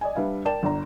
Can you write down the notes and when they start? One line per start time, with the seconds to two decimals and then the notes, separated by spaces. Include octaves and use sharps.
0.01 D5 D#5 G#5
0.15 G3 D4 B4 E5 F5
0.45 A#4 D5 G5 A5 E7
0.63 G1 D5 A#5